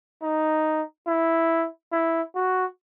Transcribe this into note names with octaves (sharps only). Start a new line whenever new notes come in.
D#4
E4
E4
F#4